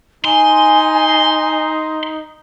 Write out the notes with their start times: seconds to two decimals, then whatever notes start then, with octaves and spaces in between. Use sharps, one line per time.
0.25 D#4 G#5 C6